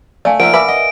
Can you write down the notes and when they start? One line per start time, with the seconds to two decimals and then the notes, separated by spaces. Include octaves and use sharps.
0.25 A3 D5 F5 G#5
0.40 F3 A#3 A#4 E5 F#5 D7
0.54 B4 E5 G#5 B5 D6 E6
0.68 D#5 F#5